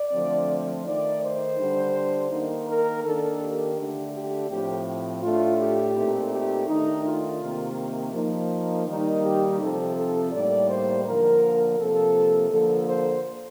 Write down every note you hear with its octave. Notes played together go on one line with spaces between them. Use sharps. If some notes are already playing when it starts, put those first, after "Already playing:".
Already playing: D5
D3 F3 A3 C4
D#3 A3 D#4 D5
C5
D3 G3 D4
D#3 A#3 D#4
A#4
D#3 A#3 D4 A4
G4
D3 A3 D4
G4
A2 F3 C4 G4
A2 A3 D4 F4
G4
A#2 A3 C4 D#4
G4
D#3 A3 D4 D#4
F4
C3 D#3 A#3
F3 A#3 D#4
D#3 G3 A#3 D#4
G4
C3 F3 C4 A4
A4
A2 G3 A#3 D#4 D5
C5
D3 F3 A#3 A#4
C3 F3 A#3 A4
D3 F3 A#3 A4
C5